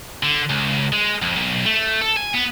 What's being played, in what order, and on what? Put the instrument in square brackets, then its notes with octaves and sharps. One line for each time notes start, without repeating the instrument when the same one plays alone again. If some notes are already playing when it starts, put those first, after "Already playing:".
[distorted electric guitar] D3
C#2
G#3
F2
B1
A3
A4
G#5
B3